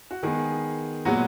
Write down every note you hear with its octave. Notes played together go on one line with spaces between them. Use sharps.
F#4
D#3 G#3 B3 G#4
A#2 F#3 G#3 B3 F#4